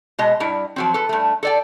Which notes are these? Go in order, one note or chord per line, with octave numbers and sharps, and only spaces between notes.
B2 G#3 D#5
G2 G3 E4
F3 F#3 C4
A4 B4
G2 A3
A4 D5 G5